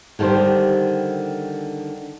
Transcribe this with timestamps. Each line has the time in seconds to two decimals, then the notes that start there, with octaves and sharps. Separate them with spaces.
0.19 D3 D#3 G3 G4 C5